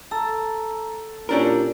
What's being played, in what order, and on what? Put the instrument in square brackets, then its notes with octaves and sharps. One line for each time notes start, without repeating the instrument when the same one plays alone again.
[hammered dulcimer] A4 [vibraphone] A#5
[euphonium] A#2 [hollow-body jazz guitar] C#4 D4 A#4 [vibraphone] E4 G4